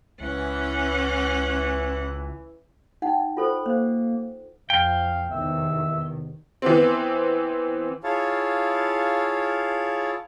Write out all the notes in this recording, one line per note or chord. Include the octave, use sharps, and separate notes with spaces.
C#2 E3 C#4 F#5
D#4 F#5 G5
F4 A4 C5 B5
A#3 C5
F2 F5 G5
E2 C3 D#3 E5
E3 B3 C4
E4 F4 G#4 C#5 F5 A5